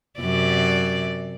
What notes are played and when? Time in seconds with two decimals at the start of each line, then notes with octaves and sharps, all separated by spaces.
0.20 F#2 C3 D5